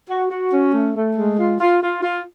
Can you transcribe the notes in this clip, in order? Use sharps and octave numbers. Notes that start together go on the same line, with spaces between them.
F#4
F#4
C#4
A3
A3
G#3
F4
F4
F4
F4